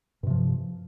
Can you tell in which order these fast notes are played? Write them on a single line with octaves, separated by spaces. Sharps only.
G2 C3 F3